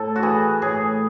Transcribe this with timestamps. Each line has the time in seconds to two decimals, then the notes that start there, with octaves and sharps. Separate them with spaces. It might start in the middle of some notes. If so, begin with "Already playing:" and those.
Already playing: A2 A4
0.16 F#4
0.23 E3 G#4
0.62 A2 G#4